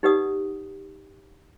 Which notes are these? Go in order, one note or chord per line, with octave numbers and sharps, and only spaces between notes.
D#4 G4 B4 D5 F#5 D#6